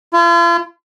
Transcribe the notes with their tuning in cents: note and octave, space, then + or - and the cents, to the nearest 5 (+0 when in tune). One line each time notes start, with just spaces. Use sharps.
F4 -40